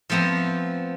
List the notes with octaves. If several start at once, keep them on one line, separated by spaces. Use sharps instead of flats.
F3 A3 B3 C4 A#5